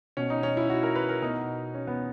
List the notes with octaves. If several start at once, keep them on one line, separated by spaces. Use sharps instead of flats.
B2 C#4
D#4
C#4
E4
F#4
A#4
B4
A#4
B2 D#4
C#4
B3